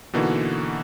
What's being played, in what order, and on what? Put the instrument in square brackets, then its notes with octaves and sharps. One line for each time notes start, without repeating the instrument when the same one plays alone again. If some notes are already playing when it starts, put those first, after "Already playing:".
[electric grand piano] B2 D3 E3 A#3 D#4 F#4